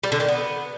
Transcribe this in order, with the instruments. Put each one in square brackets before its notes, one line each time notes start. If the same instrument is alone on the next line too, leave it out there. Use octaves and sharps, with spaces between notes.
[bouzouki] G3
D3
D#3
B3